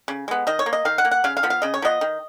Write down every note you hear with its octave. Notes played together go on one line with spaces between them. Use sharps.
C#3
G#3 B3
D#3 D#5
C#5
A#3
D#5
D#3 F5
F#5
A#3
F#5
C#3 F5
F5
F3 B3
F5
C#3 D#5
C#5
F3 B3 D#5
D#3